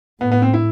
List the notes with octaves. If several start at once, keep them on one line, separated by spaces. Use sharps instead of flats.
A2 B3
B3
C4
E4